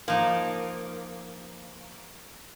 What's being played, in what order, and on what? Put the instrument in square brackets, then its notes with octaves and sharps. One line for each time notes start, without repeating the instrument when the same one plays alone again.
[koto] F3 D#4 [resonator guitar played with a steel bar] A#3